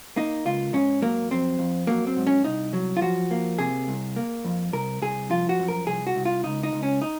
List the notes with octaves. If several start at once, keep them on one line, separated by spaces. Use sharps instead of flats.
A#3 D#4
C#2 F4
G#2 C#4
F#3 A#3
F2 C4
F2
F#3 A#3
C4
G#2
C#4
C2 D#4
F#3
F4
F3 F#4
A#3
C3 G#4
C2
A#3
F2
C2 A#4
C2 G#4
F3 F4
F#4
F#2
A#4
C2 G#4
F#4
C2
F4
C#2 D#4
D#4
C#2
C#4
D#4